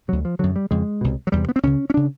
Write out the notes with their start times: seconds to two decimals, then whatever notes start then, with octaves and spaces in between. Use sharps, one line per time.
0.08 D2 C3 F#3
0.25 F3
0.39 F#2 D3 F#3
0.56 G3
0.71 F2 C#3 G#3
1.01 C2 B2
1.27 F#3
1.32 E2 C3 G3
1.49 B3
1.56 C4
1.63 C#2 C#3 C#4
1.90 C#4
1.94 C#3 D4